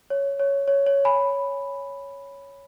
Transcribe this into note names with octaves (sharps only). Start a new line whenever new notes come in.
C#5
C#5
C#5
C#5
G#5 B5